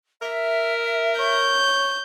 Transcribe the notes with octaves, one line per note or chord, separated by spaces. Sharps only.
A#4 E5
C#5 G6